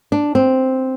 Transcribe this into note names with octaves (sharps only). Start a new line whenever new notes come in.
D4
C4